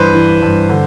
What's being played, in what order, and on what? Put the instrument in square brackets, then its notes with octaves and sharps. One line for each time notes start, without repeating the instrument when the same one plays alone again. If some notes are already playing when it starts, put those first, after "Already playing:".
Already playing: [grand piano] G2 E3 B4 C5
E3
G2
D3